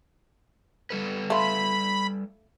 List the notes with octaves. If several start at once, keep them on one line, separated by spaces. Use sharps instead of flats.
G3 A4 B4
A3 F4 B5